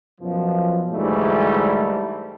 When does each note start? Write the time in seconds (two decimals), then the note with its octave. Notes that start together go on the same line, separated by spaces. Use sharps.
0.20 F#2 B2 F3
0.91 D2 G#2 E3 G3 A3